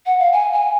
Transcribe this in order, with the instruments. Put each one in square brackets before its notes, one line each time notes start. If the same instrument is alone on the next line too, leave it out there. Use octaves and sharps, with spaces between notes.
[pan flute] F#5
F5
G#5
G#5